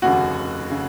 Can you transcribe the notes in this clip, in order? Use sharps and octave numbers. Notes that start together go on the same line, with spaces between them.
F1 D#2 C#3 F#4
C#3